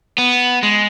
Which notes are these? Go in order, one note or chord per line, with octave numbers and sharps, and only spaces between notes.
B3
G#3